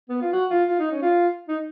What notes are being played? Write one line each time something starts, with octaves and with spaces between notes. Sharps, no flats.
B3
F4
F#4
F4
F4
D#4
C#4
F4
D#4